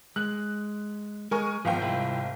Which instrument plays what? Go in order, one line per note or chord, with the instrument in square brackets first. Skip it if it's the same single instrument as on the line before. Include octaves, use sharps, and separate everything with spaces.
[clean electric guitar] G#3 [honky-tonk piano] F#6
[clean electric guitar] G#3 [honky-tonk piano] A#4 G#5 C#6
[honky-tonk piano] G#1 F5 G5 [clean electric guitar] F3 B3
[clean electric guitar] C2 E4 F4